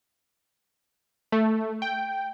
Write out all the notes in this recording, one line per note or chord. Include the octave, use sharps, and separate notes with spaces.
A3
G5